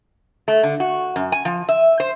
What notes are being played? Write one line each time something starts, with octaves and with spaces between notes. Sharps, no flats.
A3
D3
F#4
F#2
G#5
F3
E5
C5